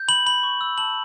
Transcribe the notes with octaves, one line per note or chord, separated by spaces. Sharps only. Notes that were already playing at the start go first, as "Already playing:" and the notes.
Already playing: G6
B5 F#7
B5 F#7
C#6
E6
A5 F#7